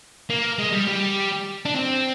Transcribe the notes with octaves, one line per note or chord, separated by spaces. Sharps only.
A#3
G#3
G3
G3
D4
C4